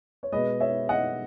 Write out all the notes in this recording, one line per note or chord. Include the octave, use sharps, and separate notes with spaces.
C#5
B2 G#3 B4 D#5
C#5 E5
D#5 F#5